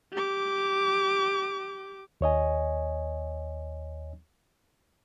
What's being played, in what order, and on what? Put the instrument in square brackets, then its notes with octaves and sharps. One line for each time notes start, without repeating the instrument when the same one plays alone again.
[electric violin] G4 D6
[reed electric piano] D#2 C#5 D#5 G#5